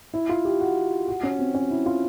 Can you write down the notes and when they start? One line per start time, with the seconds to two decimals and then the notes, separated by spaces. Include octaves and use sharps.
0.14 E4
0.29 F4
0.45 G4
0.60 F#4
1.08 F#4
1.23 C#4
1.39 C4
1.55 C#4
1.71 E4
1.86 F4